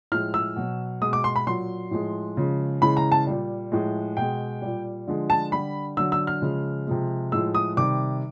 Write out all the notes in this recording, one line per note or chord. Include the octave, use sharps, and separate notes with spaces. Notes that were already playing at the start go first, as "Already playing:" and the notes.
A2 F3 G#3 F6
E6
B2 F#3
B2 G#3 D#6
D6
C6
B5
A#2 F#3 C6
A2 F3 G#3
C#3 F3 G#3
C#3 E3 G#3 B5
A#5
A5
A#2 G3
A2 F3 G#3
B2 G#3 G5
A#2 G3
D3 F3 G#3
A5
D3 G3 B5
D3 F#3 E6
E6
F6
C#3 F3 G#3
C3 F3 G#3
A2 F3 G#3 E6
D#6
C3 D#3 G3 D6